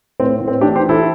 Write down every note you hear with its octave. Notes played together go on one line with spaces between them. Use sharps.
A2 C4
A2
C4
E3 D4 G4
G4 C5
E3
E4 A4